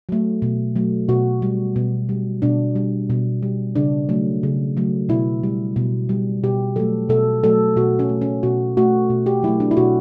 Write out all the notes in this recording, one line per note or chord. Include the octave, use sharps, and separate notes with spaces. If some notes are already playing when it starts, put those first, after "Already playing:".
F#3 A3
B2
F#3 A3
B2 F#4
G3
B2
G3
B2 D4
G3
B2
G3
C#3 D4
F#3 A3
C#3
F#3 A3
B2 E4
G3
B2
G3
B2 G4
F#3 A3 A4
B2 A4
F#3 A3 A4
B2 F#4
C#4
A3
C#4
B2 F#4
A3 F#4
B2
G4
F#3 A3 E4
D4
E4
B2 F#4